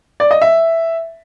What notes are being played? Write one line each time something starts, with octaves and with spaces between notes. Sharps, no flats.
D5
D#5
E5